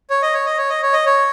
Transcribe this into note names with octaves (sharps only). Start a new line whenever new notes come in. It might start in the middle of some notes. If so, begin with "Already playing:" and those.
C#5
D#5
C#5
D#5
C#5
D#5
C#5
D#5
C#5